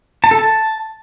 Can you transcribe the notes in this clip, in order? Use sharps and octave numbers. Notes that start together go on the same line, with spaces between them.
A5
A4
A5